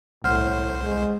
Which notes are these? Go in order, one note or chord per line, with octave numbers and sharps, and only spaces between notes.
C2 A2 C5 F#5 F6
G#3